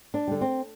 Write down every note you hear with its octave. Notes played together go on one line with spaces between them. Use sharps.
D4
D3 G3
C4